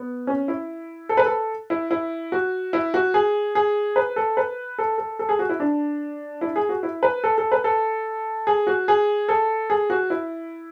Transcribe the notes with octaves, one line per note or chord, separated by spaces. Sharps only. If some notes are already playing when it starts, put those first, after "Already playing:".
Already playing: B3
C#4
E4
A4
B4
A4
E4
E4
F#4
E4
F#4
G#4
G#4
B4
A4
B4
A4
A4
A4
G#4
F#4
E4
D4
E4
G#4
F#4
E4
B4
A4
A4
B4
A4
G#4
F#4
G#4
A4
G#4
F#4
E4